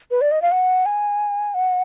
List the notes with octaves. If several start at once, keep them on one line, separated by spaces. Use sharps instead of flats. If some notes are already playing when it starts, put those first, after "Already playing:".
B4
D5
D#5
F5
F#5
G#5
F#5